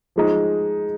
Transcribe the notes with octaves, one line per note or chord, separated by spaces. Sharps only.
F3 G#3 D#4